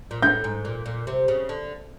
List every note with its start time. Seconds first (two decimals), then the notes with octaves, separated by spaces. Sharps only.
0.11 A#2
0.22 A2 G6
0.44 G#2
0.65 A#2
0.86 A#2
1.07 C3
1.28 C#3
1.49 D3